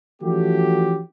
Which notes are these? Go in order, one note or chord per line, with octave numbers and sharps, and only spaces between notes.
E3 F3 A3 C#4 F#4 G4